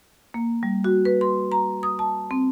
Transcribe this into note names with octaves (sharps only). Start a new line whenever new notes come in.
A#3
G3
F#4
B4
C6
A#5
D#6
A5
C4